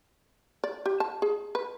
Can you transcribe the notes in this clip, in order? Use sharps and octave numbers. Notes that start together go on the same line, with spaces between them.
D5
G4
A5
G#4
B4